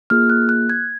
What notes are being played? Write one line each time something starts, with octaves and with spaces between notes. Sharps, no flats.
A#3 F4 G#4 F6
F#6
F#6
G#6